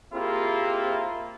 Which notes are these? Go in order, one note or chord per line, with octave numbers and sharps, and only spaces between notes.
A#3 C4 E4 F4 G4 G#4